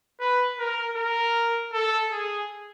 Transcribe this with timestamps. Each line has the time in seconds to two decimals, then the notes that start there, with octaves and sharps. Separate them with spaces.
0.20 B4
0.58 A#4
0.96 A#4
1.73 A4
2.11 G#4